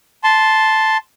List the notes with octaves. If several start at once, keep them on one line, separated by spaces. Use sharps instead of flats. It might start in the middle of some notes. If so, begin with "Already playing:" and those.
A5 C6